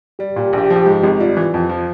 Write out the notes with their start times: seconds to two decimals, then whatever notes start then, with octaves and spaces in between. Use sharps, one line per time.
0.19 G3 G4
0.36 A#2 G4
0.53 A#1 G4
0.70 F3
0.76 G4
0.86 G#2
1.04 G#1
1.20 G3 F4
1.37 E3
1.54 F2
1.69 F3